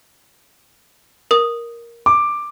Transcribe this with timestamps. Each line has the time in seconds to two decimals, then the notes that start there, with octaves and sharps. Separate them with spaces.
1.31 A#4 D#6
2.06 D6